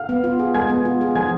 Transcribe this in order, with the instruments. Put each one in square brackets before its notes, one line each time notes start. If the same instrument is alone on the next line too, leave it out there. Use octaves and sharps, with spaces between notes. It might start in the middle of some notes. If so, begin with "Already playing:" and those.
Already playing: [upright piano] F5 F6
[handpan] B3
F4
G#4
[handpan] G#3 [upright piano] G#5 G#6
[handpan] B3
F4
G#4
[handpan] F3 [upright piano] G#5 G#6